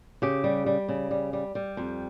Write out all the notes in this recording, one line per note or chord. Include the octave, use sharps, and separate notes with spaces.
C#3 G4
G3
G3
C#3
G3
G3
G3
F2